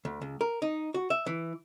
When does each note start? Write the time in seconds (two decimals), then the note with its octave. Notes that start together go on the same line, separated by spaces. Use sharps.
0.05 D2
0.22 C#2
0.41 A#4
0.62 D#4
0.94 F#4
1.10 E5
1.26 E3